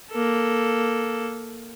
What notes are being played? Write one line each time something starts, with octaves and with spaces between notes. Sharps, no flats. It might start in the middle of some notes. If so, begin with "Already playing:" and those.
A#3 A4